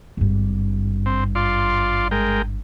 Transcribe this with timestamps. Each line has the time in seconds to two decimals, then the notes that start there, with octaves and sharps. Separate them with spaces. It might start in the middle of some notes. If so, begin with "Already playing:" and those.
0.17 G#1 G2
1.06 C4
1.35 F4 D5 C6
2.11 G#3 A#4 G5